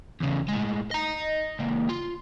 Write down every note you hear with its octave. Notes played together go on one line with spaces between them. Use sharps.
E2 C#3
A2 G#3
D#5 A#5
C#2 A#3
F4